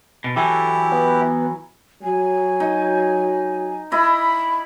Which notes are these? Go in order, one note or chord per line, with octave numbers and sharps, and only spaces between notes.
B2
E3 F#3 E4 G4 A4
B3
F#3 G#5
D#4
E4 D#5 B5